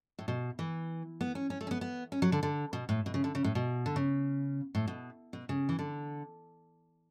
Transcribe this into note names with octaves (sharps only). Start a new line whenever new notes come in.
A2
B2
E3
B3
C#4
C#4
A3
C#4
B3
B3
C#4
F#3
D3
D3
B2
A2
B2
C#3
D3
C#3
A2
B2
D3
C#3
A2
B2
B2
C#3
E3
D3